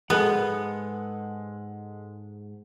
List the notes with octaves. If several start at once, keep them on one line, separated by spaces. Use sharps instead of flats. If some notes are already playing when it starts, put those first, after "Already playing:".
G#2 G#3 B3 A4 F#5